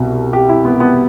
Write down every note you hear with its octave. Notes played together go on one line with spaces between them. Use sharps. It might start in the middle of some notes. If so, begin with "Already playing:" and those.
Already playing: C2 B2
G4
E4
B3
B3